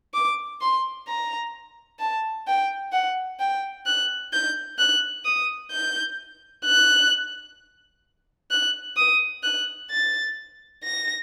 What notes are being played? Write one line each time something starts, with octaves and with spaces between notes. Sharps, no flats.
D6
C6
A#5
A5
G5
F#5
G5
F#6
G6
F#6
D#6
G6
F#6
F#6
D#6
F#6
A6
A#6